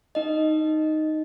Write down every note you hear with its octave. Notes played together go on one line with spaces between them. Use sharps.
D#4 D#5